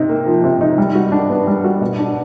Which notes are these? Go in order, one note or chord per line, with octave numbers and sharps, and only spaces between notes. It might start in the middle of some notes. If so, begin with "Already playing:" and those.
Already playing: C3 D#4
A#3
F3
C3
D#4
G3
F#4
D4
B3
G3
F#4
B2
D4